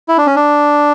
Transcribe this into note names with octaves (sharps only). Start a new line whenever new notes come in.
E4
D4
C#4
D4